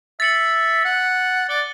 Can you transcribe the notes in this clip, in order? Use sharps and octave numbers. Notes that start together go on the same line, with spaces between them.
E5 A6 C#7 F#7
F#5
D5 F#6 A6 C#7 G7